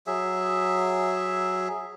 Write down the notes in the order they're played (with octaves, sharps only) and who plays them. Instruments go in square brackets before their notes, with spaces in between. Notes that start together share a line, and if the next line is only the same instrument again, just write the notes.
[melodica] F#3 G#4 E5